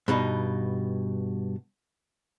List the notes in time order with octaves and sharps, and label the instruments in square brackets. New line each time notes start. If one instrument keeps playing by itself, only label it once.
[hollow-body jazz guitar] G2 B2 D#4